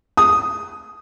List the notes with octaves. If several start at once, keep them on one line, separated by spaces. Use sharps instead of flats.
D#6